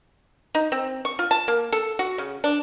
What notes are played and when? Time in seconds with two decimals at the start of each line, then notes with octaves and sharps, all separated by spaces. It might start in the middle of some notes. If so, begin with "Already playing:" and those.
0.55 D#4
0.72 C4
1.05 C#6
1.19 F4
1.31 A5
1.48 A#3
1.72 A4
1.99 F#4
2.18 C#3
2.44 D4